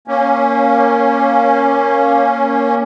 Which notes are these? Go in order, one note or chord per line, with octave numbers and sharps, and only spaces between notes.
A#3 C#4